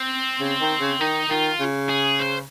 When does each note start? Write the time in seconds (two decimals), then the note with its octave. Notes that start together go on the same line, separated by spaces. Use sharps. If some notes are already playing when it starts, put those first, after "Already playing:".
Already playing: C4
0.40 C#3
0.60 D#3
0.80 C#3
1.00 D#3 D#4
1.30 D#3 F4
1.60 C#3
1.89 G#4
2.19 C5